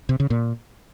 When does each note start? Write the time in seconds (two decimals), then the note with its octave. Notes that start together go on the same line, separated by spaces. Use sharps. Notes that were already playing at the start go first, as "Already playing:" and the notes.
0.09 C3
0.20 C#3
0.30 A#2